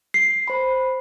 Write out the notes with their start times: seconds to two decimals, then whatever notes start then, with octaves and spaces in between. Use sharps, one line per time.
0.14 C7
0.48 C5 B5